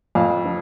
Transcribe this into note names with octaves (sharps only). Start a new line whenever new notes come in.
F2 F5
F3